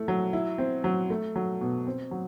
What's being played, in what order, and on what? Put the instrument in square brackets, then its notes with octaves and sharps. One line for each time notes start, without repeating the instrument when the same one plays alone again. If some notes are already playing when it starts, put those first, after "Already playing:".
Already playing: [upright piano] A3 E4
F#3
E4
C4
F#3
A3
F#3
B2
C4
F#3